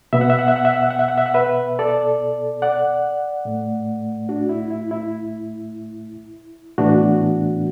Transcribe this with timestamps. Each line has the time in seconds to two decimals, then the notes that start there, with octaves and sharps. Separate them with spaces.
0.13 B2 B3 E5
0.21 F#5
0.30 E5
0.39 F#5
0.48 E5
0.56 F#5
0.65 E5
0.73 F#5
0.83 E5
0.90 F#5
0.99 E5
1.08 F#5
1.18 E5
1.26 F#5
1.34 B4 E5
1.79 A4 D5
2.62 D5 F#5
3.45 A2 A3
4.29 D4 F#4
4.49 E4
4.70 E4
4.91 E4
6.78 A2 E3 B3 D4 F#4